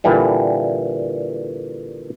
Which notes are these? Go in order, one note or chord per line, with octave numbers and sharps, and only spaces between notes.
A#2 D3 E3 G3